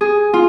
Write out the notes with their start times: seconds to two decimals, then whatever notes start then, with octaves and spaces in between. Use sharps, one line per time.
0.01 G#4
0.33 F4